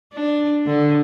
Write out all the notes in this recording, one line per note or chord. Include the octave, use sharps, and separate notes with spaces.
D4
D3